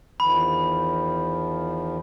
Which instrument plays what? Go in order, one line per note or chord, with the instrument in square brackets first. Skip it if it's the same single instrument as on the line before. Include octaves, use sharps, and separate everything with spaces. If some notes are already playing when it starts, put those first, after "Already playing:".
[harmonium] E2 D#3 F3 [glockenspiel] B5